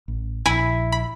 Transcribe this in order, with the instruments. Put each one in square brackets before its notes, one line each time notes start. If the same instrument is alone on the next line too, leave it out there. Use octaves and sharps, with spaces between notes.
[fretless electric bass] A1
[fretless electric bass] A#1 [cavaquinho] E4 [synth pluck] G#5 B5
[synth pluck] B5